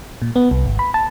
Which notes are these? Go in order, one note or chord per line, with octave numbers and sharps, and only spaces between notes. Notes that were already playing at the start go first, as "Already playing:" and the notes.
A#2
B3
C2
G#1
B5
A5